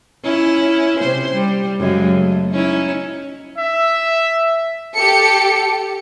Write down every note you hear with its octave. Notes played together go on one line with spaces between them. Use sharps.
C#4 E4
C3 C5
G3
F#2 C#3 G#3
A3
C#4 D#4 E4
E5
G4 A4 C#7